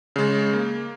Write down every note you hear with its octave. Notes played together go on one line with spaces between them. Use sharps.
C#3 G#3
A#3